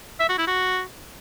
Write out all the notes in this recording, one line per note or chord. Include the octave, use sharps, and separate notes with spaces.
E5
F#4
E4
F#4